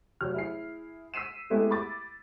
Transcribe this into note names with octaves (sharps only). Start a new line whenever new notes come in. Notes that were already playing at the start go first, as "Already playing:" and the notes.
F1 F#3 F6
E4 G#4 C7
E6 B6 C7 D#7 E7
G#3 A3 B3 E4 G4 A4
B5 D6 A6